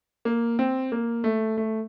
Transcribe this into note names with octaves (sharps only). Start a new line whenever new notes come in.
A#3
C4
A#3
A3
A3